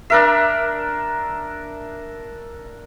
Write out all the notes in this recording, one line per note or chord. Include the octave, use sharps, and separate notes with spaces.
D4 A#4 E5